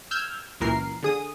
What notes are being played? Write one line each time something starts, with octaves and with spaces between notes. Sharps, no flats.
E6 F6 G6 G#6
C#2 F#2 A#2 E3 A#4 C7
D3 G#4 D#6